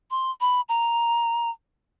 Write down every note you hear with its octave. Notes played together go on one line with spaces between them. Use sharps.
C6
B5
A#5